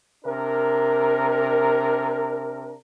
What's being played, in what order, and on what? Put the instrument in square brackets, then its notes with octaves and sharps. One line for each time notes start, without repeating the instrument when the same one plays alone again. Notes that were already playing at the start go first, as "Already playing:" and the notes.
[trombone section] C3 D4 A#4